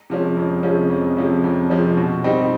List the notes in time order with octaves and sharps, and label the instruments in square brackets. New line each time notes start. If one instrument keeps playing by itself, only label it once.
[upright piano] C3 F3 G#3 C#4
F2
C3 F3 G#3 C#4
F2
C3 F3 G#3 C#4
F2
C3 F3 G#3 C#4
B2
G3 C4 D#4